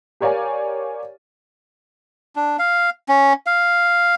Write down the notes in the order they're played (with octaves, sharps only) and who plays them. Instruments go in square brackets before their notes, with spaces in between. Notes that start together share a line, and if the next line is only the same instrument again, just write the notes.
[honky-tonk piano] G4 A#4 C#5 D5 F5 G#5
[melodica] D4
F5
C#4
F5